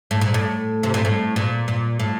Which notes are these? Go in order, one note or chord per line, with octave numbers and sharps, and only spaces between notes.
A2
A#2
A2
C3
A#2
A2
A#2
A#2
A2